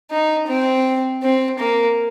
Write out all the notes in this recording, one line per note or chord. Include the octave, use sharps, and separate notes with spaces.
D#4
C4
C4
A#3